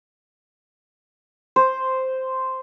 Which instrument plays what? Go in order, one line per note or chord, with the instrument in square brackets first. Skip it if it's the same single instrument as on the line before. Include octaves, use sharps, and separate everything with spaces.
[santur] C5